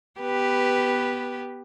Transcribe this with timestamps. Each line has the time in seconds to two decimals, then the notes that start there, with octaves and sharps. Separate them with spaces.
0.20 B3 G4 B4